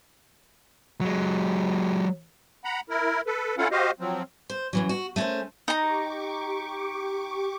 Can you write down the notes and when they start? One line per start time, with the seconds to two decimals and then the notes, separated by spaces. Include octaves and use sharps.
1.01 F#3 G#3
2.64 F#5 A#5 B5
2.90 E4 A#4
3.27 A4 B4
3.58 C#4 E4 F4 A4 F5 F#5
3.71 F#4 G4 C5 D#5 F5
4.00 F3 F#3 C4
4.50 C5
4.73 F#2 E3 F#3
4.89 F#4
5.16 A3 B3 C#4 A#4 C5
5.68 D#4 G4 A#5 C#6 D6